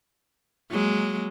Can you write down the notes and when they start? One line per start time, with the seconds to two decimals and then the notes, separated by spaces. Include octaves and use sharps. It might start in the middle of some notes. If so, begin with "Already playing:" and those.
0.71 F#3 G#3 A#3